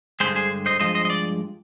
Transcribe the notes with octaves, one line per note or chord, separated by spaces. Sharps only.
G2 D3 G#3 G#4 C5
G#4 C5
C5 D#5
G2 F3 G#3 C5 D#5
C5 D#5
D#5
D5